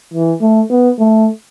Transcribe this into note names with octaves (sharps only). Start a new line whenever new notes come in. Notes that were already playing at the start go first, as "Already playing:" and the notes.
E3
A3
B3
A3